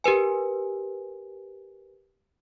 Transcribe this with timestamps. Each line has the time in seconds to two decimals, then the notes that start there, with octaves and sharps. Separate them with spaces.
0.04 G4 A#4 B4 G#5